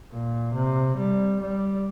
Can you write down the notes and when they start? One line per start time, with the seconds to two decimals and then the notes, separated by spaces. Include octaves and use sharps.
0.12 A#2
0.54 C3
0.97 G3
1.41 G3